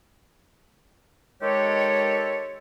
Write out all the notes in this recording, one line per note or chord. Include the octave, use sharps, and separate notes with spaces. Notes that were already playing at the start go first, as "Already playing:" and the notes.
D#3 G#3 G4 A4 C#5